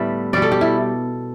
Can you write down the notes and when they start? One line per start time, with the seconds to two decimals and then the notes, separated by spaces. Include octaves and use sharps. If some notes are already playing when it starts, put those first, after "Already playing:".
Already playing: A2 D3 G3 B3 A4 B4 E5
0.33 B2 G3 D5
0.42 A4
0.52 G4
0.61 E4